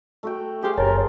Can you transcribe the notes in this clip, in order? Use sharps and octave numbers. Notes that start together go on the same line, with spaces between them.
A3 F#4 G5
G4 G#4 C5 F5
F#1 A#4 C#5 A5